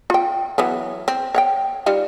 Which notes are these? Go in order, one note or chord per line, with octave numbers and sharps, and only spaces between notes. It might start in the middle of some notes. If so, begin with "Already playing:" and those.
F4 G5
E3 F#3 B3
C4
C#5 F#5 G5
G3 D#4 F4